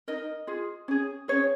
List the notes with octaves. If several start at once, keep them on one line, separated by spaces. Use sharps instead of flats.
D#4 A#4 D#5
F4 G#4
C#4 G#4
C#4 G#4 C#5